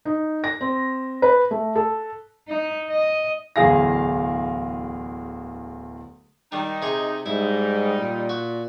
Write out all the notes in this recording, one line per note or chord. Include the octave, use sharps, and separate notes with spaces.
D#4
A#6
C4
B4
A3
A4
D#4
D#5
D1 E2 G#4 F5 A#6
D#3 G3 D#4
C3 G#4 C#6
G#2 G3 D#4 E4
A#2
F#4